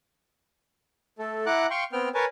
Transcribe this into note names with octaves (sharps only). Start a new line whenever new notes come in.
A3 A4
E4 F#5 A#5 D6 F#6
F5 G5 C6 C#6
B3 C4 G5 F6
A#4 B4 C#5 G#5 A5